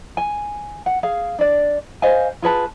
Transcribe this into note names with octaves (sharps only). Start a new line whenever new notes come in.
G#5
F#5
G#4 F5
D4 D5
C5 D#5 F5 G#5
F4 G#4 B4 A5